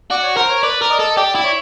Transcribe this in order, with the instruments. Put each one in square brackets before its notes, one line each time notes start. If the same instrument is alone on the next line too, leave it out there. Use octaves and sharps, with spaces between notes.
[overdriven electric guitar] F#4 [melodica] D5
[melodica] C#5
[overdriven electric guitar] A#4 [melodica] C5
[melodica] C#5
[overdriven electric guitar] B4 [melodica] D5
[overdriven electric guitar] A#4
[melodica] D#5
[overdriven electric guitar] A4
[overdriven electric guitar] G4 [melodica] D5
[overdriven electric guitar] E4
[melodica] C#5